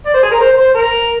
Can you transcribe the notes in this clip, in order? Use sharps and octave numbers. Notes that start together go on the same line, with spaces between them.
D5
C5
G#4
A#4
C5
C5
A#4